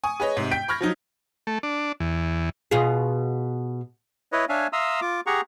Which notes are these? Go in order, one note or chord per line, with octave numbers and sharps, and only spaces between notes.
G#5 C#6 D#6
G#4 B4 C#5 D#5
G#2 C3
G5 G6 B6 D7
B5 C#6 F6 G#6 A#6
F3 F#3 D#4
A3
D4
E2
B2 F4 G#4
E4 B4 C#5 D#5
D4 C#5 E5 F5 G#5
E5 F5 A#5 C6 D#6 E6
F4 D6
G4 G#4 F#5 A#5 C#6